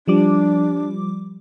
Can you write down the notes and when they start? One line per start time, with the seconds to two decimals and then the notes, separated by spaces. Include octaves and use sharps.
0.08 F3 G3 D4 D6